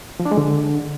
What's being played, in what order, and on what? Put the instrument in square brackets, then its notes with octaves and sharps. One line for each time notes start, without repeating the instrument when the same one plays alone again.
[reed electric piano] F3
D4
G#3
D3